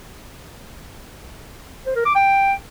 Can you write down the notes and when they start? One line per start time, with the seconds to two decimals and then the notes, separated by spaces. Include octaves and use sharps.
1.86 C5
1.96 A#4
2.05 D6
2.15 G5